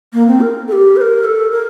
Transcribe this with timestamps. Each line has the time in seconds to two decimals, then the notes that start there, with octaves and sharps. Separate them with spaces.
0.13 A#3
0.27 C4
0.41 A#4
0.68 A4
0.72 G4
0.96 C5
1.01 A#4
1.24 A4
1.51 A#4